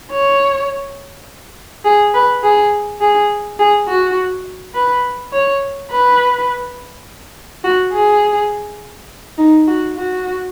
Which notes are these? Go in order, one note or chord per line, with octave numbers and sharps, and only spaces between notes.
C#5
G#4
B4
G#4
G#4
G#4
F#4
B4
C#5
B4
F#4
G#4
D#4
F#4
F#4